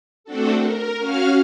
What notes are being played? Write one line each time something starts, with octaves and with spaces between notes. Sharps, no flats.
A3 C4 D4 F#4 A4
A#4
C#4 F#4 F5 F6